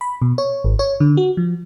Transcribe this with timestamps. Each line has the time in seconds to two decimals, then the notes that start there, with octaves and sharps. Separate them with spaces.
0.01 B5
0.22 B2
0.38 C#5
0.64 G#1
0.79 C#5
1.00 D3
1.17 F#4
1.37 F3